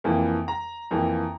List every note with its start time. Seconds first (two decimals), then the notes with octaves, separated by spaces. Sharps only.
0.04 F2 E3 A#3
0.48 A#5
0.91 F2 E3 A#3